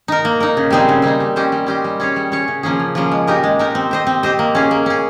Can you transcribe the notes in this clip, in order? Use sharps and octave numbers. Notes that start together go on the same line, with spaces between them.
D#4 A#4
A#3
D#4 A#4
C#3
G3 C4 D#4 G#4
C#3
G3 C4 D#4 G#4
G3
C#4 G4 C5 D#5
G3
C#4 G4 C5 D#5
G3
C#4 G#4 C#5
G3
C#4 G#4 C#5
C#3
F3 A#3 C#4 G#4
C#3
F3 A#3 C#4 G#4
G#3
D#4 G4 A#4 D#5
G#3
D#4 G4 A#4 D#5
C4
G4 C5 D#5
C4
G4 C5 D#5
A#3
C#4 G#4
A#3
C#4 G#4